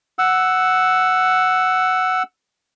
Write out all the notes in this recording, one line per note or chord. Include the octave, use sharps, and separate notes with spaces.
F#5 E6